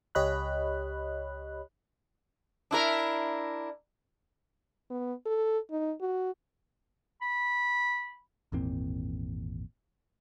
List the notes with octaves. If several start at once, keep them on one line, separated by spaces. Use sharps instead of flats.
C#2 G4 C#5 D#5 B5 F#6
D4 E4 A#4
B3
A4
D#4
F#4
B5
G#1 E2 A#2 C4